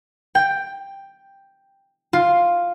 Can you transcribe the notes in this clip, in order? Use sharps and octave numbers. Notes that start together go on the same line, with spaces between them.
G5
F4